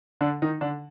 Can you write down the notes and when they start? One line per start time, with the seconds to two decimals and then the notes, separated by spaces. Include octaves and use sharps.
0.21 D3 D4
0.42 D#3 D#4
0.61 D3 D4